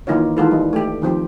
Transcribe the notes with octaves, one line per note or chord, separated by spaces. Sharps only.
D#3 E3 A#3 D#4 F4 C#5
D#3 E3 G#3 F4 A4 B4
G3 D#4
A3 G4
D#3 F3 C4 G4